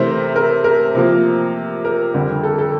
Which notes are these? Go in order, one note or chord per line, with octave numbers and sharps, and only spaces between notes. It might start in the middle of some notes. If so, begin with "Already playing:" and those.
Already playing: C3 E3 A3 A#4 C5
A#4
A#4
C3 F3 A#3
A#4
F2 D3 G3
A4
A4